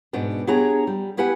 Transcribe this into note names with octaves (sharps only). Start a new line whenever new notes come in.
G#2 B2 B3 D4
B3 D4 G4 G#4 C#5 A#5
G3
B3 E4 G4 B4 F#5 G#5